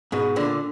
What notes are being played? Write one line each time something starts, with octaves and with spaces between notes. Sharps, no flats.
G#2 B2
A#2 D3